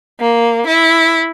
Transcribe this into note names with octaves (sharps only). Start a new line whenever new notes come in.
A#3
E4